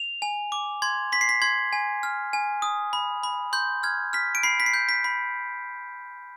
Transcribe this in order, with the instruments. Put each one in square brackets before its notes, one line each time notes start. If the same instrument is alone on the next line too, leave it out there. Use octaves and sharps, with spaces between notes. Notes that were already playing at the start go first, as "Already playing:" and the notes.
Already playing: [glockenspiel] F7
G#5
D6
C6 G#6
C6 B6
C7
B6
C6 G#6
G#5
F6
G#5
D#6
B5
B5
C6 G6
F6 G#6
F6 B6
D7
B5 C7
B6
C7
G6
B6
B5